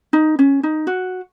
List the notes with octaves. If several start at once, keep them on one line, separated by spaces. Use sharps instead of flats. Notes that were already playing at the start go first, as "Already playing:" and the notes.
D#4
C#4
D#4
F#4